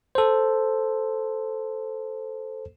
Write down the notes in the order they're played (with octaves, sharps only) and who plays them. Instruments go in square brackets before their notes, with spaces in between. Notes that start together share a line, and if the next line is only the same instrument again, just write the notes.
[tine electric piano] A4 C5